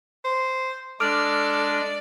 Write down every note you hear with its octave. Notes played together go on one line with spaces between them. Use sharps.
C5
G#3 D4 A4 D5 D6 F6